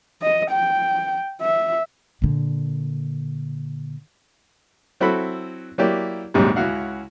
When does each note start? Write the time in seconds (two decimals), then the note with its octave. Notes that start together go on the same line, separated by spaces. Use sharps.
0.23 D#5
0.51 G5
1.41 E5
2.22 A#2 D3
5.00 F#3 C4 E4 F#4 A4 B5
5.78 F#3 A#3 E4 G4 D5
6.34 A#1 D#2 G#2 C3 F#3 G3
6.56 C#2 C#4 E4 F#4 F5 F#5